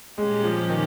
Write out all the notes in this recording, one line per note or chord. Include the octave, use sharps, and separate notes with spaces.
A#2 G3 G#3 C#4 G4
F3
D#3